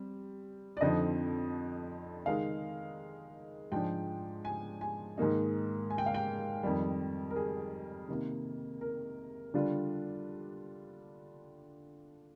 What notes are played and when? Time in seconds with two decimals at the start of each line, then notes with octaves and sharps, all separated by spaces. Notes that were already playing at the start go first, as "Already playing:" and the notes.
Already playing: G3 C4
0.77 D5
0.81 F2 D3 F3 C4 D#4 D#5
2.26 D#3 G#3 D#4 F5
3.72 G#2 F3 G#3 D4 G5
4.45 G#5
4.81 G#5
5.18 G#2 D#3 A#3 D#4
5.90 G#5
5.98 G5
6.06 F5
6.14 G5
6.63 F2 D#3 G3
7.31 A#4
7.36 G#4
8.08 C3 D#3 A#3
8.81 A#4
9.54 D3 G3 D4 F4